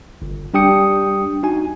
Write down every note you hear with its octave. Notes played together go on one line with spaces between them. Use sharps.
G1
G3 D4 G4 G5 D#6 C#7
D#4 F#4 G#5